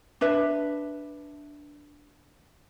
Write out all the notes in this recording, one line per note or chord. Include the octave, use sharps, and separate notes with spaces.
D4 B4 E5